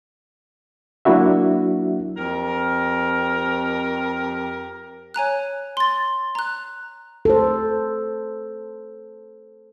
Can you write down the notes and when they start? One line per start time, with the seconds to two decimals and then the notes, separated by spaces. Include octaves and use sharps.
1.05 F#3 A#3 D4 E4 F#4 E5
2.16 F2 G4 A#4
5.14 C#5 G#5 A#5 F#6
5.77 C6 A6
6.35 A#5 F#6
7.25 A4 C5